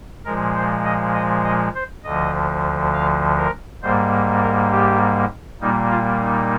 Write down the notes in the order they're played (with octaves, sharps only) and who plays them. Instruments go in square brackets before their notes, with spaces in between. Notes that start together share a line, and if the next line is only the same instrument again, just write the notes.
[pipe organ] A#2 F3 G#3 A#4
C5
D#5
D#5
D#5
C5
D2 D3 F3 D#5
F5
A#4
G#2 G3 A#3 C5
A#4
G4
A#2 G3 A#3 D#4
F4
D#4